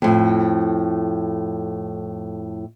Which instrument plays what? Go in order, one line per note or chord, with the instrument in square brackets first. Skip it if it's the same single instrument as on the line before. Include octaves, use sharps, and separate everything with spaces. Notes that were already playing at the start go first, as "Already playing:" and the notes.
[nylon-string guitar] F2 A2